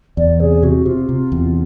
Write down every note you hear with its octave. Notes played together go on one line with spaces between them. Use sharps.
E2 D5
C3 G#4
C3 F#4
C3 F4
C3
E2